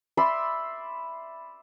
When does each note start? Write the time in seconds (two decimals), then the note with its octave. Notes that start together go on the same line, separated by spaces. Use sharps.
0.17 D5 E5 B5 C6